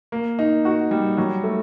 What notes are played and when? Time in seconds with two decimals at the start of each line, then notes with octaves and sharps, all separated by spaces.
0.12 A#3
0.39 D#4
0.65 F#4
0.91 G3
1.18 F#3
1.44 A3